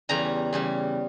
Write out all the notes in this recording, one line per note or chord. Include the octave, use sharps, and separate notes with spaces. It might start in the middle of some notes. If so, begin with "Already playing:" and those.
E2 C#3 G3 A#5
E2 C#3 G3